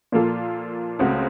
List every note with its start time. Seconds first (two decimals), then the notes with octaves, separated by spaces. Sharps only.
0.12 A#2 F3 A#3 F4 A4
0.99 C#2 C#3 A3 C4 F#4